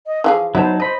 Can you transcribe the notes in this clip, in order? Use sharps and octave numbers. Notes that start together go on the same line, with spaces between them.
D#5
E3 F3 G#4 F5
F#3 B3 D#4 E4 C5 A5
E4 C5 D#5 B5